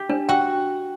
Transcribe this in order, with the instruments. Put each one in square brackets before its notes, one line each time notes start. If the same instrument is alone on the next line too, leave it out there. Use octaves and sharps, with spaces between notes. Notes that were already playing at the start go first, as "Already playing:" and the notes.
Already playing: [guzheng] G4
[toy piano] D4
[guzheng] F#4 [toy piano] G5